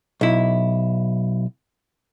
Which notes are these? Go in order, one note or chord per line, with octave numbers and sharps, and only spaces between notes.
B1 E4